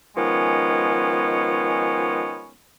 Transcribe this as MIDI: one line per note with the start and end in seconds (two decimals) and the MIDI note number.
0.17 2.55 51
0.17 2.55 53
0.17 2.55 56
0.17 2.55 59
0.17 2.55 61